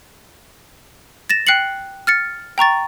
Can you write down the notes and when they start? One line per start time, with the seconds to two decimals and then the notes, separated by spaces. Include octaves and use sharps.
1.30 A6 A#6 E7
1.47 G5 F#6 C7 C#7 F#7
2.07 F6 A6 C#7
2.58 G5 A#5 C#6 A6